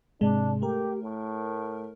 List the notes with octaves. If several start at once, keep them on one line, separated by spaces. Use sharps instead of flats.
G#2 C3 G#3 D4
A3 G4 A#4
A2